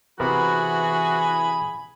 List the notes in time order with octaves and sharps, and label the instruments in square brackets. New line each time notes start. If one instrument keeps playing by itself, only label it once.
[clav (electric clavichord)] C3 B3 A#4 [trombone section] E3 [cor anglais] F#4 [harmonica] G#4 G#5 B5